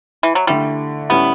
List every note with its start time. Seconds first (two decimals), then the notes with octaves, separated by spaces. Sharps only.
0.23 E3
0.35 F#3
0.47 D3 G3 A3 E4
1.10 A2 G3 B3 C#4 E4